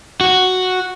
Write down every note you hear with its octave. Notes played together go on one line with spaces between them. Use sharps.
F#4